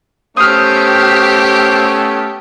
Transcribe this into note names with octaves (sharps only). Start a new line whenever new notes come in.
A3 B3 C#4 G4 C5 D#6 F6